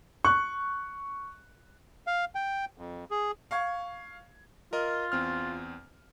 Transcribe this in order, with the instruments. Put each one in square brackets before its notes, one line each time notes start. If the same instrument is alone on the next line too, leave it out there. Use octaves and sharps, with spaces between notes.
[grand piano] C#6 F#6
[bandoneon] F5
G5
F2
G#4
[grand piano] F5 C#6 G#6
[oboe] F4 [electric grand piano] A#4 D#5
[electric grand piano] E2 C4 F6